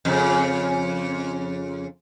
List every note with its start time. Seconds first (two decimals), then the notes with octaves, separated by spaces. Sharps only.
0.05 F2 C#3